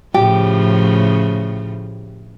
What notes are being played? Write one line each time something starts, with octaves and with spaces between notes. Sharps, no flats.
A2 C#3 F3 G4